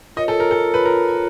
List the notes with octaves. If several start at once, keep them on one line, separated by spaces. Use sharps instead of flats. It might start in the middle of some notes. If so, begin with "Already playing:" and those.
F4 A#4 C#5 D#5
A4
A#4
A4
F4 A#4 C#5
B4
A#4
F4 A#4 C#5